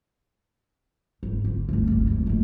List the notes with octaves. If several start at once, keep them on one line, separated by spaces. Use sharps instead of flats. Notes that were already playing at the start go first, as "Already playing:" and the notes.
G#1
D3
G1 D2
D#2 C#3
F#1 G#2
D#2 A3